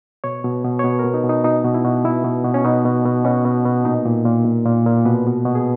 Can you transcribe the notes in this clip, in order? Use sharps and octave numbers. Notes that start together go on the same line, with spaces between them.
B2 C#5
B2
B2
C#5
B2 B4
A#4
B2
D#4
B2
D#4
B2 D#4
B2
E4
B2
B2 E4
B2
B2
C#4
B2 D#4
B2
B2
B2 C#4
B2
B2
A#2 D#4
A#2
A#2
A#2
A#2
A#2
B2 B4
B2
B2
G#4